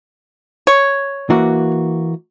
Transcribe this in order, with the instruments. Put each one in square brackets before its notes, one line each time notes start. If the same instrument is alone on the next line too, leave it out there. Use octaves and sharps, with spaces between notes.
[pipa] C#5
[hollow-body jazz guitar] E3 A#3 F#4